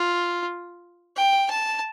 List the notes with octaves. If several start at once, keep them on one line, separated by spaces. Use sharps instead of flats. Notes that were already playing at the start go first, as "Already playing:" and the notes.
Already playing: F4
G5
A5